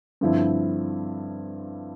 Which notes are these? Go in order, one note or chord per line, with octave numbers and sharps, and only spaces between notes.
G2 D3 F3 C4 E4